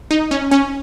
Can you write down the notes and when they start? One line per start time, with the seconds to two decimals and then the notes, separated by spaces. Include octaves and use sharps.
0.11 D#4
0.31 C#4
0.51 C#4